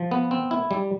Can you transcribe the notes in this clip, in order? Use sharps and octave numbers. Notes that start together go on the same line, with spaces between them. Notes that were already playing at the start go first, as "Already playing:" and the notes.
Already playing: F3
B3
C4
E4
G3